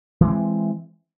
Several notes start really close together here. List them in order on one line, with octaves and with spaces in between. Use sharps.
E3 G#3 C4